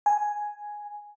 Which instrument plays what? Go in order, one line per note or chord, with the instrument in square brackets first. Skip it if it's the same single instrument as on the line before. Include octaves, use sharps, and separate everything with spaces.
[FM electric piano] G#5